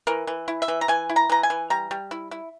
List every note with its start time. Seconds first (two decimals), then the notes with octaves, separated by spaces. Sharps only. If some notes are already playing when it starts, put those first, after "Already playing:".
0.07 E3 A#4
0.27 E3
0.48 E4
0.62 E5
0.68 E3
0.81 A#5
0.88 E3 G#5
1.09 E4
1.16 A#5
1.30 E3 A#5
1.43 G#5
1.50 E3
1.70 G3 A#5
1.91 G3
2.11 E4
2.31 E4